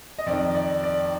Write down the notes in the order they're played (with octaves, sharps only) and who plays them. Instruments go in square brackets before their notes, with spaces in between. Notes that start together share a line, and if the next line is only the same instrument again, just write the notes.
[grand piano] D#5
F2 D#3 D5
D5
D5